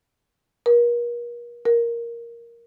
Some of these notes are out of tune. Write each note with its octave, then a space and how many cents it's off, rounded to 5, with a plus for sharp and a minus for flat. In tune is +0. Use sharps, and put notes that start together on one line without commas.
A#4 +40
A#4 +5